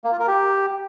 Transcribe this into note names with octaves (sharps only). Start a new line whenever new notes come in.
A#3
F4
A#4
G4